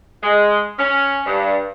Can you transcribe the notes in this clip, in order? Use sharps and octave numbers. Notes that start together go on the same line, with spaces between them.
G#3
C#4
G2